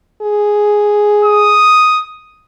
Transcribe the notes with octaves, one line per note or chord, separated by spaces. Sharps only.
G#4
D#6